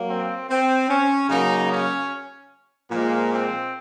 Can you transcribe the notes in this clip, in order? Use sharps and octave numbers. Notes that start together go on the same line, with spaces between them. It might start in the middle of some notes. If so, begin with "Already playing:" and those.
Already playing: F#3 A#3
C4
C4
C#4
C#3 F#3 A#3 D#4
C#4
A#2 F3 G#3 A#3
C4